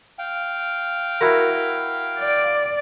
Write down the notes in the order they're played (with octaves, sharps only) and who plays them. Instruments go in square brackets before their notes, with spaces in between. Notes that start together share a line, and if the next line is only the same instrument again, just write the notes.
[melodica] F5 G5
[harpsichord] E4 F#4 A#4
[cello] D5